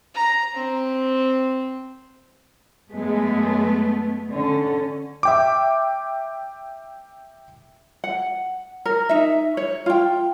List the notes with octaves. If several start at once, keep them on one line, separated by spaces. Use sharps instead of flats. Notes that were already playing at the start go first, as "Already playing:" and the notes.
A#5
C4
F#2 G#3 A3 B3
D3 C#4
E5 G5 D6
F#5
A#4
D#4 E5
C#5
F4 G5